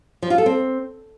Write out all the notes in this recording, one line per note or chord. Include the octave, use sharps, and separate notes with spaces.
F3
F4
A4
C4